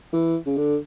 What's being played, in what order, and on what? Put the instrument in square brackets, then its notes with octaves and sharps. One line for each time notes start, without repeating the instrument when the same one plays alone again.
[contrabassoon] E3
C#3
D3